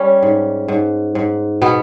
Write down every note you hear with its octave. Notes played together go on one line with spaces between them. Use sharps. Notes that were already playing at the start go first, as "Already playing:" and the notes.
Already playing: G3 C#4
G#2
G#2
G#2
B2 B3